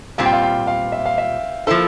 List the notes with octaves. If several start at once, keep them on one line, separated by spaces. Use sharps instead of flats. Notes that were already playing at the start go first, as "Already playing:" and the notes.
A#2 G3 C4 F4 F5
G5
F5
G5
F5
E5
F5
E5
F3 A#3 E4 A4 C5